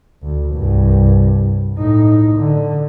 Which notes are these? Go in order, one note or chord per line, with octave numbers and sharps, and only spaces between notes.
D2
C2 G2
A2 D#4
D3